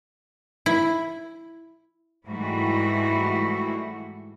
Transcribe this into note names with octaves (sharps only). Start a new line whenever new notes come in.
E4
G#2 E3 G3 A3 E4 F#4